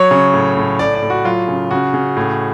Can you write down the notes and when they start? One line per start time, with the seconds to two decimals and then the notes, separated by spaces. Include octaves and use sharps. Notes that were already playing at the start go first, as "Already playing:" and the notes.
Already playing: F#3 C#5
0.11 C#3
0.33 A2
0.57 A2
0.79 A2 D5
0.95 D5
1.03 A2
1.10 F#4
1.25 F#3 F4
1.48 C#3
1.71 C#3 F#4
1.94 C#3
2.17 A2